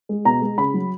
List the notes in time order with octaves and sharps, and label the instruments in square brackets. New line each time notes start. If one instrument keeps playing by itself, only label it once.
[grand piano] G#3
B2 A#5
G#3
C#3 B5
F#3